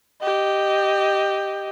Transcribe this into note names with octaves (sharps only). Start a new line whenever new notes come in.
G4 D#5